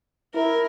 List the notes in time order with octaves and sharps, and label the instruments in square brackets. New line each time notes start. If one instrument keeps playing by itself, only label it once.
[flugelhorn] E4 [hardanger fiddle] A#4